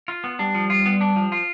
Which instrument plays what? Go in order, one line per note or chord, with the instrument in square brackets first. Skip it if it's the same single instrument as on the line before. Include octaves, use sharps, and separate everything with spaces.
[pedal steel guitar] F4
B3
[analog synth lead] G3 [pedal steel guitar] D4
[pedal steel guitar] F3
F4
B3
D4
F3
F4